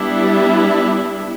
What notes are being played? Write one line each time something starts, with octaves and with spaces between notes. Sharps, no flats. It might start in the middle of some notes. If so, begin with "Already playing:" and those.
Already playing: G3 B3 D4 E4